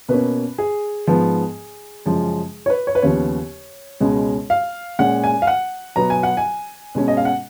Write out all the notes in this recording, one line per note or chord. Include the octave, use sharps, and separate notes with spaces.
B2 A#3 C#4 B4
G#4
G#2 F3 B3
F#2 C#3 F3 G#3
C#5
B4
C#5
B4
D#2 C#3 F3 B3 C#5
C#2 B2 G#3 C#4
F5
A#2 G#3 C#4 F#5
G#5
F5
F#5
B2 F#3 B3 A#5
G#5
F#5
G#5
B2 G#3 C#4
D#5
F5
F#5